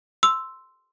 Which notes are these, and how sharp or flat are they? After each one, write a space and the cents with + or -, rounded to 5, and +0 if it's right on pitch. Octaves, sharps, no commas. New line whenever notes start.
C6 -5 E6 +0